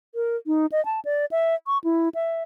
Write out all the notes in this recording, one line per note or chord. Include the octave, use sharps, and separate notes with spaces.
A#4
D#4
D#5
A5
D5
E5
C#6
E4
E5